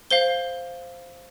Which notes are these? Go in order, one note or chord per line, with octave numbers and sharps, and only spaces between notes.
C5 F5 G7